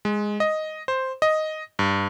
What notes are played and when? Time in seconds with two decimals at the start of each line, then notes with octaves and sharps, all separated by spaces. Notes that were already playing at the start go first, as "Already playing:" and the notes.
0.05 G#3
0.40 D#5
0.88 C5
1.22 D#5
1.79 G2